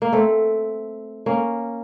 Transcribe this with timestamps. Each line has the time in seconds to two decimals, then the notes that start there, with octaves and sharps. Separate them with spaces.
0.02 A#3
0.13 A3 C4
1.26 A#3 C#4